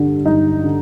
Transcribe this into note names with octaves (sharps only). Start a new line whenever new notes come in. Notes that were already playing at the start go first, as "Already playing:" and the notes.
Already playing: G2 D3 G3 D4
G2 D#4
D3